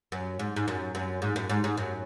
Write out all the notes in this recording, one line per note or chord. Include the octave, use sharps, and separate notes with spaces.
F#2
G#2
G#2
F#2
F#2
G#2
F#2
G#2
G#2
F#2